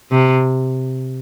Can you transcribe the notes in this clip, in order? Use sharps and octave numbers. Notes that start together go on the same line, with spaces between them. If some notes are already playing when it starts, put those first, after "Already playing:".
C3